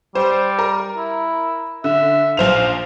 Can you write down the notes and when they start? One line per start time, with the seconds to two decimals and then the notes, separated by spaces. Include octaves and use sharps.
0.15 G3 C5
0.59 A#4
0.97 E4
1.84 D3 E5
2.37 A#1 C5 F5 F7